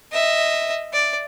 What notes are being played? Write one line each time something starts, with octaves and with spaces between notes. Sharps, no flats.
D#5 E5
D5